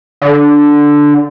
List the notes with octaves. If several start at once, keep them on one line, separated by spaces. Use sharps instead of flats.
D3